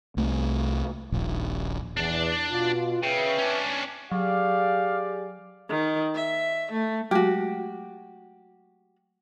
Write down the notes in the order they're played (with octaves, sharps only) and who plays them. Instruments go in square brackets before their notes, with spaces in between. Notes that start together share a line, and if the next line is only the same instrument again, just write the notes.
[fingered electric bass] C2 A3
D#1 A#1
[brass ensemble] E2 [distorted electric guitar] D4 D5
[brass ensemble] B2 F4
[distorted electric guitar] C#3 [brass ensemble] B4 E5 G5
[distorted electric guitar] C#4 D4
[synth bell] F#3 [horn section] G4 G#4 D5 [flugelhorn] F5
[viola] D#3
E5
A3
[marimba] F#3 G#3 A3 [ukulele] F#4 G4